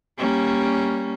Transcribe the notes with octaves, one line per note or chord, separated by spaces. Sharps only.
G3 A#3 C#4